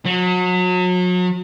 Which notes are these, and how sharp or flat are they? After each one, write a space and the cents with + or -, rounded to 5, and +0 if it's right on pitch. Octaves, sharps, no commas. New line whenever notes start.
F#3 -35